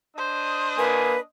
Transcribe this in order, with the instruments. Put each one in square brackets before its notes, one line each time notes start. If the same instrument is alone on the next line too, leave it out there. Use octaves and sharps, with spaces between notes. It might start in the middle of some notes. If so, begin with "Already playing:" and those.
[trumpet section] D4 D#5 D#6 [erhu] C5
[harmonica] A#3 G#5 [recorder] B4